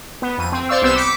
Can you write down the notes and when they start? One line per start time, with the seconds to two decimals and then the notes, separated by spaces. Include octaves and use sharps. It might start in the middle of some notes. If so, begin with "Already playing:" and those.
0.22 B3
0.38 F2 D#7
0.52 C4
0.69 C5 D5 F5 C#6 E6
0.82 C2 B3 C4 C5 E6 E7
0.96 D6 B6 C#7